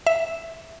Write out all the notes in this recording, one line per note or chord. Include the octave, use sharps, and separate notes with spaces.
E5